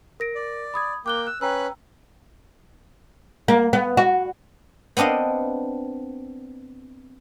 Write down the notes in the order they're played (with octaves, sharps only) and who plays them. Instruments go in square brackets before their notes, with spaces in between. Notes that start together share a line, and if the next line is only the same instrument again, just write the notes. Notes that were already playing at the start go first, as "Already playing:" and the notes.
[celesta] A#4 A#6 D7
[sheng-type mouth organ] D5
[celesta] B5 D#6 G#6
[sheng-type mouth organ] A#3 G5 [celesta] D6 F#6 G7
[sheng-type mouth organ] E6 [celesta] F#6
[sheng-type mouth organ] C#4 B4 F#6 [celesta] G5 A#5 E6
[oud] A#3
B3
F#4
[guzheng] B3 C4 D4 D#5 F5